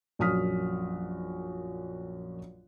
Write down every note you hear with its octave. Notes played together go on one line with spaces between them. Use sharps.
A#1 F#2 F#4 D#6 F6 B6